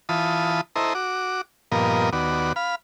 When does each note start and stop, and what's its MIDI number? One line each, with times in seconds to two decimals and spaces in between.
0.09 0.61 52
0.09 0.61 65
0.09 0.61 81
0.09 0.61 83
0.09 0.61 87
0.76 0.94 64
0.76 0.94 69
0.76 0.94 72
0.76 0.94 75
0.76 0.94 82
0.95 1.41 66
0.95 1.41 86
1.72 2.10 43
1.72 2.10 46
1.72 2.10 53
1.72 2.10 59
1.72 2.10 70
1.72 2.10 75
2.13 2.53 39
2.13 2.53 59
2.13 2.53 66
2.13 2.53 74
2.56 2.75 77
2.56 2.75 83